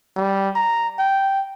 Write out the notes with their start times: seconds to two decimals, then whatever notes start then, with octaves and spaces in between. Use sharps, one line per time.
0.16 G3
0.55 A#5
0.99 G5